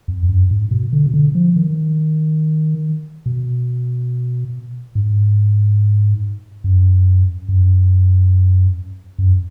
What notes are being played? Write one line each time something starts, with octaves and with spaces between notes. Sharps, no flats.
F2
F#2
G#2
B2
D3
B2
D3
F3
D#3
B2
G#2
F#2
F#2
F#2